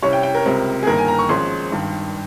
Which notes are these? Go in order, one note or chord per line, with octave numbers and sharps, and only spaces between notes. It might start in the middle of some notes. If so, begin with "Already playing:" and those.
C2 C3 G3 C#4 C#5
G5
G5
A#4
C#2 C3 G3 C4
G#4
G1 G2 D#3 A#3 A#4
G#5
A#5
C#6
G#1 G#2 F3 G#3 C#4 C6
G#1 G2 D#3